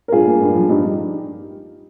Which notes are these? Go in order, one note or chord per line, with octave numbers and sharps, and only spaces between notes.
A#4
G2 F4 G#4
A#3
G2
F3
G2 D#4 G4
G2